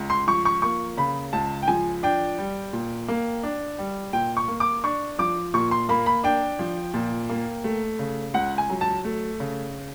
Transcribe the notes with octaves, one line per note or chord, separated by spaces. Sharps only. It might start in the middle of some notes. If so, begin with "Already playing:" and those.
Already playing: C#2
C6
F3 C#6
C#6
A#3 C#6
C#3 B5
C#2 A5
G5
F3 G#5
D4 G5
G3
A#2
A#3
D4
G3
A#2 G5
C#6
A#3
D6
D4 C#6
F3 D6
A#2 C#6
C6
A#3 B5
B5
D4 G5
F3
A#2
A#3
A3
C#3
C#2 F#5
G#5
F#3
A5
A3
C#3